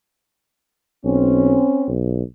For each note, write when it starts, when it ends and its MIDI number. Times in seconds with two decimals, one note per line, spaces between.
1.05 1.58 35
1.05 1.92 60
1.05 1.92 61
1.88 2.22 35